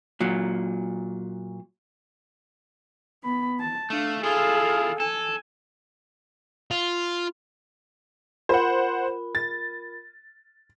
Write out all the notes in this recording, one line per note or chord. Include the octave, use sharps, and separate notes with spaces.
A#2 F#3
B3 B5
A5
A3 D4 F5
E4 F4 G#4 A4 F5
A4 G#5
F4
F4 A#4 C5 F#5 B5
A6